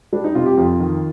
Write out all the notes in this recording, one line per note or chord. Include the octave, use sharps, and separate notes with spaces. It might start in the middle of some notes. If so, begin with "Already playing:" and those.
G3 D4
D#4
C3 F4
G4
F2 F4
D#3